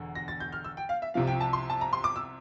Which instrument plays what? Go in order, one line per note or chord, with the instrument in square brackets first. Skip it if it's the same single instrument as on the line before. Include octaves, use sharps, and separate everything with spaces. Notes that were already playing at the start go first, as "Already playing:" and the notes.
Already playing: [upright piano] E1 E2 D3
A#6
A6
G6
F6
E6
G5
F5
E5
C2 C3 F3 F5
G5
A5
C6
A5
A#5
C6
D6
E6